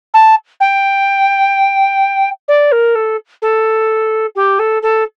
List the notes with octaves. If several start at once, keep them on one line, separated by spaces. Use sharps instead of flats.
A5
G5
D5
A#4
A4
A4
G4
A4
A4